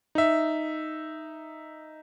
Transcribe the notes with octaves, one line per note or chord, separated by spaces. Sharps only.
D#4 E5